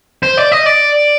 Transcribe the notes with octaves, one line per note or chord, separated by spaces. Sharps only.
C5
D5
D#5
D5